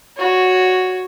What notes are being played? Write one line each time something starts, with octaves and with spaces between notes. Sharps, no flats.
F#4 C#5